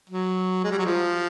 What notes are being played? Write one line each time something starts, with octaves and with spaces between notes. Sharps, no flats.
F#3
G#3
G3
F#3
F3